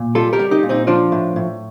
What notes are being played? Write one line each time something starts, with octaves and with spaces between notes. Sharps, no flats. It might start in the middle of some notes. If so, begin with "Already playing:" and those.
Already playing: A#2
G3 F4 A4
G4 A#4
G3
D#4 G4
A#2
C4 D#4
F3 D4 F4
A2
A2